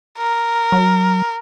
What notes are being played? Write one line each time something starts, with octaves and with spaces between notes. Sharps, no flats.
A#4
F#3